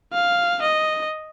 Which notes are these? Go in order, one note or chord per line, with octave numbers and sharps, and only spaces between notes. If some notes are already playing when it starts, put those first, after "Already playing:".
F5
D#5